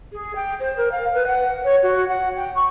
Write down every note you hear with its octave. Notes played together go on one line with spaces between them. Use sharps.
G#4
G5
C5
A#4
F5
B4
F#5
C#5
F#4
F#5
G5
C#6